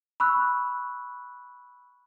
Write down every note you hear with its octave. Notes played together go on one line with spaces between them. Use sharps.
B5 C#6 E6 F#6